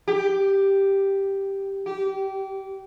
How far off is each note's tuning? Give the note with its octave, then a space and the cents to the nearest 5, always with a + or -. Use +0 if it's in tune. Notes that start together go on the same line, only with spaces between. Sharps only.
G4 +0
G4 -25